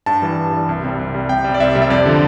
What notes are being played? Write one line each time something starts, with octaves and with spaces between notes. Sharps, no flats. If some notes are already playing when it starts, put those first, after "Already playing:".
G2 A5
E3 G3
G2
E3 G3
C2
C3 G3
C2
C3 G3
C2 G5
C3 G3
D5
C2 E5
C3 G3
E5
F2 D5
D3 F3